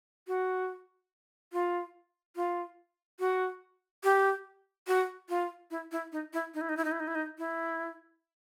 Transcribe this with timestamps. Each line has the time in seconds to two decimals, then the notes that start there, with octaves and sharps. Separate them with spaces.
0.27 F#4
1.53 F4
2.36 F4
3.19 F#4
4.04 G4
4.87 F#4
5.29 F4
5.71 E4
5.92 E4
6.12 D#4
6.33 E4
6.54 D#4
6.61 E4
6.69 D#4
6.77 E4
6.84 D#4
6.92 E4
7.00 D#4
7.07 E4
7.15 D#4
7.38 E4